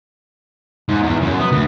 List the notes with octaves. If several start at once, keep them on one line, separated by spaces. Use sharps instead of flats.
G#2
E2
F#2
B3
D2